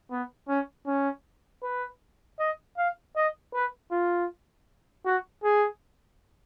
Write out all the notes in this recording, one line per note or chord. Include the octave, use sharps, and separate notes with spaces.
B3
C#4
C#4
B4
D#5
F5
D#5
B4
F4
F#4
G#4